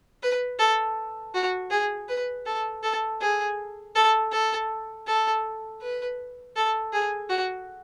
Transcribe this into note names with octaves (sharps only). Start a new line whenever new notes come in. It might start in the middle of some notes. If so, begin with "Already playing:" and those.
B4
A4
F#4
G#4
B4
A4
A4
G#4
A4
A4
A4
B4
A4
G#4
F#4